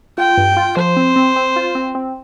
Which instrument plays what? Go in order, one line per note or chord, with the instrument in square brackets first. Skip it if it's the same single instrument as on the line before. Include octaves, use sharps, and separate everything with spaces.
[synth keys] F4 [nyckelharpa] G5
[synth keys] G2
F4
[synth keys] F3 [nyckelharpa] C5
[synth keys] C4
C4
C4
F4
C4
C4